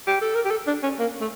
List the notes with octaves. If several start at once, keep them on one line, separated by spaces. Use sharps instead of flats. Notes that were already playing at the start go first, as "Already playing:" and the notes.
G4
A4
A#4
G4
A4
D4
C#4
A#3
A3